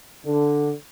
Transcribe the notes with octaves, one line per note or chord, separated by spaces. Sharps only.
D3